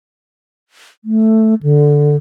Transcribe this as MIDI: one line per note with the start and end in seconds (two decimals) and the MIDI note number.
1.05 1.55 57
1.63 2.16 50